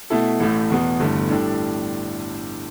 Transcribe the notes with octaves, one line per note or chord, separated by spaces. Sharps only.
B2 A3 E4 A4
A1 A2 A3
E2 B2 B3
G1 G2 E3 A3
A2 G3 D4 A4 D5